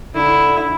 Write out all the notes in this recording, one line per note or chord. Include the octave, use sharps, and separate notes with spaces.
D3 E4